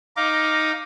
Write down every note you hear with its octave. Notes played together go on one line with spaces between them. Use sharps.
D#4 D#5 F5 D6